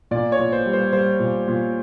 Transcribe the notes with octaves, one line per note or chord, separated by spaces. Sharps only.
A#2 D5
C#5
A#2
C5
G3
C5
G3 C5
A#2
A#2